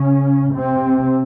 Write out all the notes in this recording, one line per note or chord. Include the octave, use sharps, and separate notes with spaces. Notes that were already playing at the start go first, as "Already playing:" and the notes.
Already playing: C#3 C#4
C3 C4